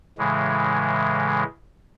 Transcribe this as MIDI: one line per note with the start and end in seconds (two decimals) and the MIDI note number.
0.18 1.44 45
0.18 1.44 49
0.18 1.44 52
0.18 1.44 56